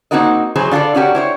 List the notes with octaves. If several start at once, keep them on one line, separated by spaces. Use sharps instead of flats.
A#3 C4 D#4 F#4 A#4 D#5
E3 F#3 G#4 C5
D3 F4 G#4 A4 D5
C#4 D4 F#4 G4 A#4
E4 C5 C#5